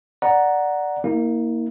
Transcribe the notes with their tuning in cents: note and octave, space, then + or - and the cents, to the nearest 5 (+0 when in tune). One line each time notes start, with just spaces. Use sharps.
D5 +0 F#5 +0 A#5 +5
A#3 +0 E4 -40